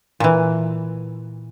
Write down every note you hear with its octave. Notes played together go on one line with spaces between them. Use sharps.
A#2 E3